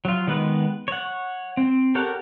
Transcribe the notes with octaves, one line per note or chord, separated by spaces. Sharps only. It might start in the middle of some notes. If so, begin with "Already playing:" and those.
F#3 F4
D#3 G#3 B3 B4
C#5 F#5
C4
G4 A4 A#4 C#5 F#5